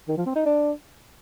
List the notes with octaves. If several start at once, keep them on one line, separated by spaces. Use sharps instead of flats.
D#3
F3
C4
D#4
D4